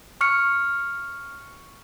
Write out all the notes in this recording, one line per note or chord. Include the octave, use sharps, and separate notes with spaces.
C#6 F6 C#7